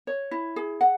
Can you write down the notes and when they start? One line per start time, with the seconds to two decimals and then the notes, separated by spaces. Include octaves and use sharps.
0.07 C#5
0.31 E4
0.56 G#4
0.81 F#5